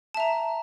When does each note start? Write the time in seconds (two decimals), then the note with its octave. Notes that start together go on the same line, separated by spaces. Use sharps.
0.14 A5
0.17 E5
0.20 A#5